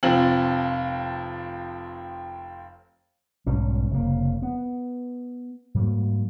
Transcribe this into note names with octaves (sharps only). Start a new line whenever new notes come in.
F1 F3 C4 F#7
B1 G#2 G3 C#4
F1 C#3 A#3
B3
G#2 F#3 G3 A#3